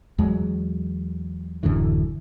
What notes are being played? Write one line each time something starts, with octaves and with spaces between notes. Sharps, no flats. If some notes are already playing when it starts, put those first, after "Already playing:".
E2 F#3 G#3
D1 F#2 D3 E3